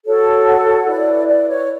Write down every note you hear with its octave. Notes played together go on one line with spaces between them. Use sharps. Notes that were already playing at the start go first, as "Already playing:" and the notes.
F#4 A4 C#5
F#5
E4 B4 D5
D5
C#5